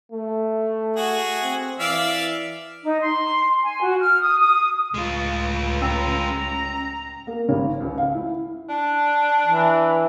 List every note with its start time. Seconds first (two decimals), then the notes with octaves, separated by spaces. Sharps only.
0.12 A3
0.96 F#4 G#4
1.43 C4
1.80 E3 D5 E5 F5
2.83 D#4
3.00 C6
3.63 G#5
3.81 F#4
3.99 F6
4.22 D#6
4.40 D#6
4.94 C#2 A2 G#3 F4
5.82 C#4 G5 A#5 E6
7.27 A#3
7.49 G#1
7.80 C#2
7.98 F5
8.15 E4
8.70 D4
9.47 E3